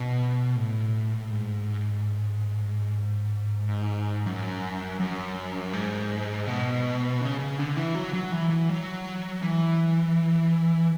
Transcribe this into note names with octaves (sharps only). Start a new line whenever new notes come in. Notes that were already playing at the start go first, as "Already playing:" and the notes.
Already playing: B2
A2
G#2
F#2
F#2
G#2
B2
C#3
C#3
D3
E3
F#3
F#3
E3
E3
F#3
E3